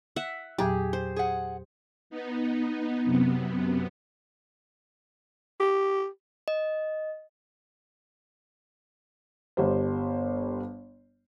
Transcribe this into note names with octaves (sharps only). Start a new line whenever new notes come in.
E5 F#5
E2 A#2 F#3 G4 G#4
C5
G#4 F#5
B3 D#4
F#2 C3 B3
G4
D#5
G1 G3 C5